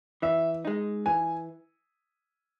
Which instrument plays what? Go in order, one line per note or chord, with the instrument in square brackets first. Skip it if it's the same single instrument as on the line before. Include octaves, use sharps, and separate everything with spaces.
[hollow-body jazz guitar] E3 [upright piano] E5
[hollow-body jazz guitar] G#3 D#4
[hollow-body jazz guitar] E3 [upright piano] G#5